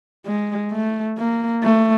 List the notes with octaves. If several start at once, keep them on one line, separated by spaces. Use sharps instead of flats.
G#3
A3
A#3
A3